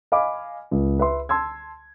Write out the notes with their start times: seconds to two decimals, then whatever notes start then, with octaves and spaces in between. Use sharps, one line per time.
0.12 D#5 F5 G#5 B5 D6
0.71 C#2
0.99 B4 E5 C6
1.29 A5 C6 E6 G#6